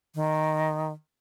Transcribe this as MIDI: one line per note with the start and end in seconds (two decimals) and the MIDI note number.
0.15 0.92 51